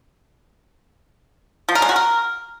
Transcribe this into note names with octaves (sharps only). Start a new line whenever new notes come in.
F3
A#4
G#3
F#4
A#4